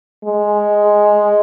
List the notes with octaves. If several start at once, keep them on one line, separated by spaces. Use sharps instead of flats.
G#3